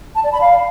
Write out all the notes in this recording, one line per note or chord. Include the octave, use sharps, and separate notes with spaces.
A5
D5
B5
F5